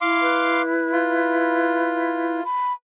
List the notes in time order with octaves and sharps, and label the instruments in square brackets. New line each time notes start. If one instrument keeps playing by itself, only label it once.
[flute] E4 [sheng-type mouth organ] F5 C6 D6
[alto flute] B4
[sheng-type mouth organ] F4
[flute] B5